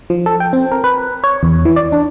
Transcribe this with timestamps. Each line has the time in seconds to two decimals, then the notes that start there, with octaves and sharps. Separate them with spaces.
0.10 F3
0.26 A4
0.40 G5
0.53 C4
0.72 A#4
0.84 B4
1.24 C#5
1.43 E2
1.65 E3
1.76 D5
1.92 D4